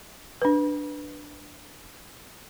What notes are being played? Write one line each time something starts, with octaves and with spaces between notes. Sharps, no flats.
D4 B4